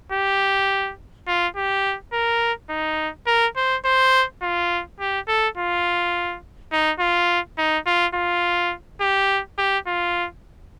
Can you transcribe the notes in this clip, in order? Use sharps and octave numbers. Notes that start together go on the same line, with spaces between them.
G4
F4
G4
A#4
D#4
A#4
C5
C5
F4
G4
A4
F4
D#4
F4
D#4
F4
F4
G4
G4
F4